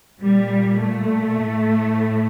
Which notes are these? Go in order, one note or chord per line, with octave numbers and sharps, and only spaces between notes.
A#2 G3
A3
A2